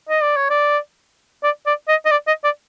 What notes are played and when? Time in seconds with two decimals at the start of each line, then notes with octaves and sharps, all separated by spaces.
0.09 D#5
0.22 D5
0.37 C#5
0.50 D5
1.43 D5
1.66 D5
1.88 D#5
2.05 D#5
2.11 D5
2.27 D#5
2.44 D5